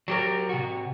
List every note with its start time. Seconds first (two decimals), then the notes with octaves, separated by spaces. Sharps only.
0.08 F#3 G4 A#4
0.49 C3 F#4